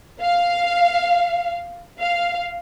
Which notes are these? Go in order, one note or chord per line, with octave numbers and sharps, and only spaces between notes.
F5
F5